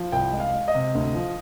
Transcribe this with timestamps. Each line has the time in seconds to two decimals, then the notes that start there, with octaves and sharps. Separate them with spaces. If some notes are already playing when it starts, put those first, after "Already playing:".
Already playing: F3
0.12 C2 G5
0.33 G#3
0.40 F5
0.54 G#3
0.68 D#5
0.75 C3
0.95 D2
1.14 F3